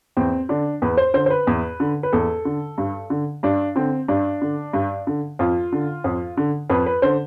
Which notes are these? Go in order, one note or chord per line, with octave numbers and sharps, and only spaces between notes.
E2 C4
D3 D4
E2 B4
C5
D3 C5
C5
B4
E2
D3
B4
E2 A4
D3
G2
D3
G2 D4
D3 C4
G2 D4
D3
G2
D3
F2 F4
D3
F2
D3
F2 B4
B4
D3 C5